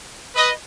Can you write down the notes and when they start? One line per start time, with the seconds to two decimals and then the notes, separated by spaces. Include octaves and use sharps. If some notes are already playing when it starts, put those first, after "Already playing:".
0.36 B4 D#5